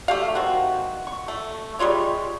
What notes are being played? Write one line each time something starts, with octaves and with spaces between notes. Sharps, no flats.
A3 G4 F5
D#3 C4 F#4
C#6
A3
G3 G#3 F4 C#5